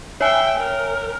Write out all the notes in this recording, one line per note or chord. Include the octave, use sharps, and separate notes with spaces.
C#5 E5 G5 G#5
A#4